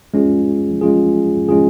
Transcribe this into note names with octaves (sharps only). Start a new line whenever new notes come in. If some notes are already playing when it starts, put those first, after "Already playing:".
G#3 C#4 F4 G#4
G#3 C#4 F4 G#4
G#3 C#4 F4 G#4